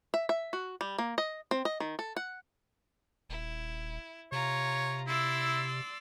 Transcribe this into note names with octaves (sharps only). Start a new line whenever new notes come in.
E5
E5
F#4
G3
A#3
D#5
C4
D#5
D#3
A4
F#5
D#1 E4
C3 F4 C#5 A#5
E4 D5 C6 E6